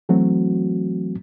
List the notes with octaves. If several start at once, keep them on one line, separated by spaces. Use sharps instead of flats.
E3 F#3 A3 C4 F#4